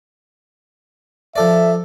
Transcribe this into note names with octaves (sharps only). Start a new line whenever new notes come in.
F3 A4 D5 E5